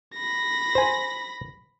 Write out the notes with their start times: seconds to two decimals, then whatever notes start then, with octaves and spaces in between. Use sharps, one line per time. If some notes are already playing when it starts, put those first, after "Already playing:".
0.15 B5 A#6
0.75 C5 G#5